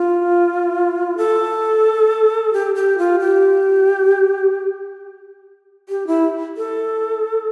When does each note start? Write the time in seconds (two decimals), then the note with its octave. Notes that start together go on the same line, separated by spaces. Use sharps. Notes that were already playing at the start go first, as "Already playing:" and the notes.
Already playing: F4
1.17 A4
2.53 G4
2.75 G4
2.98 F4
3.20 G4
5.89 G4
6.07 E4
6.57 A4